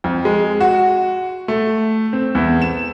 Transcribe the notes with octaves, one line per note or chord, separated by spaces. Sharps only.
F2
G#3
F#4
A3
C4
E2
E7